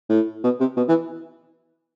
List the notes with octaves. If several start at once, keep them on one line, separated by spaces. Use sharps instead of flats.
A2
B2
C3
B2
E3